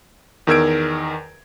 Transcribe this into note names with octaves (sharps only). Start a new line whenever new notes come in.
E2 D#3 A#4 E6 G#6 D7